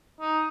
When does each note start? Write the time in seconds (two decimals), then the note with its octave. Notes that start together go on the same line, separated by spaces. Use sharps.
0.21 D#4